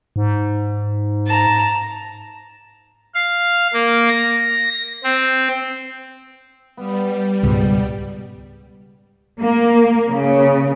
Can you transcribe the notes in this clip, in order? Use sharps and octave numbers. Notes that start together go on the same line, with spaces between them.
G#2
A5 A#5
F5
A#3
A#6
C4
G3 B3
C#2 G#2 B2
A#3
C#3